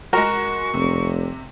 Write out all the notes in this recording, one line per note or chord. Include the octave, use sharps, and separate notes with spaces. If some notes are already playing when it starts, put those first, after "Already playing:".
G#3 F#4 A#4 C#6
F1 C3